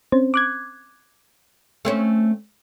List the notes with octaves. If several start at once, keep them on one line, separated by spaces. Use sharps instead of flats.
C4 C#4 C5
D6 F#6 G#6
A3 C4 C#4